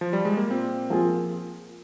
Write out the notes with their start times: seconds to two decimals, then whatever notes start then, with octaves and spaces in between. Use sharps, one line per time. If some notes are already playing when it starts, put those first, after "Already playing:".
0.01 F3
0.13 G3
0.25 G#3
0.37 A#3
0.50 A#2 C4
0.90 F3 A#3 F4 G#4